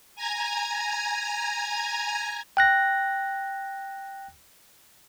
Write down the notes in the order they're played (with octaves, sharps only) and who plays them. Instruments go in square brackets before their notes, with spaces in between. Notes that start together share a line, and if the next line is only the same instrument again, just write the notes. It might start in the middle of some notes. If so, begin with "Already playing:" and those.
[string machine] G#5 A#5 G#6
[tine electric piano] G5 F#6 A#6